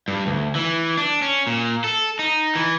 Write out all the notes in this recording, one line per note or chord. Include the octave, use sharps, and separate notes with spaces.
G2
D2
E3
D4
C#4
A#2
A4
D#4
E3